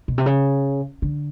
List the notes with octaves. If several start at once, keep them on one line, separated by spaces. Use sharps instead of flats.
B2
C3
C#3
D3